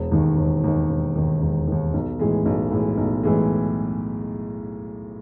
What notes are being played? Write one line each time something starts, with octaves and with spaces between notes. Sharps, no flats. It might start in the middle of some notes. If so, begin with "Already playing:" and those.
Already playing: E1
D#2 D#3
E1
D#2 D#3
E1
D#2 D#3
E1
D#2 D#3
B1
A2 E3 G#3
B1
A2 E3 G#3
B1
A2 E3 G#3